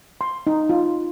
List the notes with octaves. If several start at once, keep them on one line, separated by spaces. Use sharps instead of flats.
C6
D#4
F4